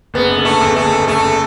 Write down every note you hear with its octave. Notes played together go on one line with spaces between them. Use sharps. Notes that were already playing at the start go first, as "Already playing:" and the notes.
F#1 B3
D3
A3
E2
A3
F#1
F#1 A3